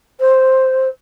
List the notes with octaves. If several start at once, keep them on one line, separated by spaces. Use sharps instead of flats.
C5